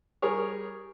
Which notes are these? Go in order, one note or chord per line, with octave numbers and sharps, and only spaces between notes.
G3 G#4 A#4 C#5